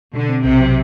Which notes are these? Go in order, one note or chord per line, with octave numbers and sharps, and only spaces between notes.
B2 D3
C4
B1 C3
F#3